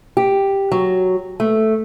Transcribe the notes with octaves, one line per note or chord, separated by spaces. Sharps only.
G4
F#3
A3